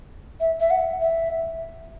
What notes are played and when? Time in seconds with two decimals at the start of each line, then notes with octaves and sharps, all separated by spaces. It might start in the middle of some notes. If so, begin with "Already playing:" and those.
0.40 E5
0.60 E5
0.71 F#5
1.01 E5